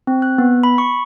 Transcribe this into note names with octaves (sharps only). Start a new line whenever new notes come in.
C4
F#6
B3
B5
C#6